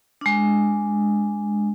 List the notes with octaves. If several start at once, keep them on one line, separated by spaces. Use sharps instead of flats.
G#3 D4